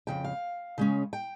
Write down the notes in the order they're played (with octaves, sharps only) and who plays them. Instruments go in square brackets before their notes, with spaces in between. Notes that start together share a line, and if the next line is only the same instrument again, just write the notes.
[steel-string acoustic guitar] F2 C#3 G5
F5
C#3 G#3 C#4
G5